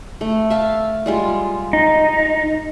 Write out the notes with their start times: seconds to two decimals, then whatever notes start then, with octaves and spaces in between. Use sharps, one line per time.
0.21 A3
0.50 E5 F5 A5
1.06 G3 G#3 F4
1.73 D#4